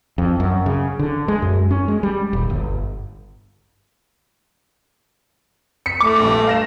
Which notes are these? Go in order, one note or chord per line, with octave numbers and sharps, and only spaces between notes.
F2
F#2
C#3
D3
G#3
F#2
C#4
G#3
G3
D#1
G1
B6 C#7
A3 D6
A#1 G2
F5 A#6 E7